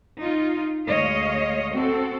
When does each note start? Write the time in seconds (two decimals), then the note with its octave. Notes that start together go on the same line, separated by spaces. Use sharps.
0.21 D#4 F4
0.88 D2 G#3 C#5 D#5 F5
1.73 C4 F#4 A4